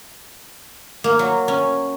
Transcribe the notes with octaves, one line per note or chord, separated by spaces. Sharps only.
A#3
F#3
C#4